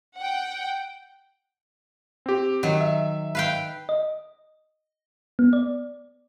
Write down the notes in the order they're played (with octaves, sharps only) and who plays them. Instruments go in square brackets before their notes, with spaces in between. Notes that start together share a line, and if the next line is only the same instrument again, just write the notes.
[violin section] F#5 G5
[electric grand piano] C4 G4
[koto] D#3 F#3
[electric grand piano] E5
[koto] B4 F5 G5
[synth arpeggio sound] D#5
B3
D5